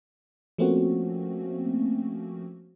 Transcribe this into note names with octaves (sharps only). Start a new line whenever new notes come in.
F3 A3 A#3 C4 C#4 F#4